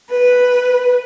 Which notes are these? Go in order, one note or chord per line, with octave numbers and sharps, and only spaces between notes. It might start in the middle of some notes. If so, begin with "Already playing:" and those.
B4